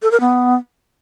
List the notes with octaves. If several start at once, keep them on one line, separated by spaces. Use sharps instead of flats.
A4
A#4
B3